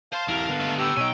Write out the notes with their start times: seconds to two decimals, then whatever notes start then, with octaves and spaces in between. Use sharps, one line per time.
0.13 C5 F5 A5 C6
0.28 E2 E4 G4 A#4
0.48 D3 B3 A#5
0.60 G#3 A3
0.78 A2 G4 A#5 E6
0.97 B2 D#4 C#5 G5 G#5